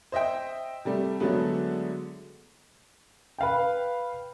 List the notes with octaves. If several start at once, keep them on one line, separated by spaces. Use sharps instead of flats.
C5 D#5 E5 G5
C3 G3 A3
D3 F#3 G#3 A3 B3
B4 F5 G5